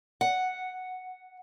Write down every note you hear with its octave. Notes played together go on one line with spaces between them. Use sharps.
F#5